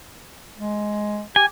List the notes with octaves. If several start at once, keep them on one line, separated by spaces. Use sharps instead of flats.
G#3
G4 G#5